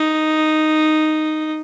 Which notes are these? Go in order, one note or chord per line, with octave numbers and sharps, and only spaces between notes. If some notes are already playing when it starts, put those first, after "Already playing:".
Already playing: D#4